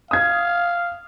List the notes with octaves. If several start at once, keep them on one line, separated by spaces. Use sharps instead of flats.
F5 D#6 G#6